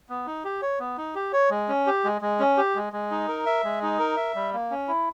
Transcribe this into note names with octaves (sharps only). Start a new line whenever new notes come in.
B3
D#4
G4
C#5
B3
D#4
G4
C#5
G#3
C#4
G4
G#3
G#3
C#4
G4
G#3
G#3
D#4
A#4
E5
G#3
D#4
A#4
E5
G3
A#3
C#4
E4